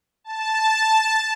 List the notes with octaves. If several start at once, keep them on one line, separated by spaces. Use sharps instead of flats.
A5